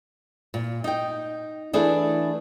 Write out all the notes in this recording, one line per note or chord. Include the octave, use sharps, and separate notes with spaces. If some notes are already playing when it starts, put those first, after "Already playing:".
A#2
D#4 G5
E3 A3 D4 G#4 A4 B4